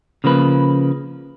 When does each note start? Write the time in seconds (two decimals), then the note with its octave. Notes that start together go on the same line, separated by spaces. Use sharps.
0.24 C#3 F3 A#3 B4